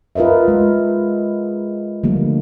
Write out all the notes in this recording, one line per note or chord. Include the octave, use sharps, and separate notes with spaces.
F4 A#4 B4 D#5 E5
G#3
D3 F3 G3 A3 A#3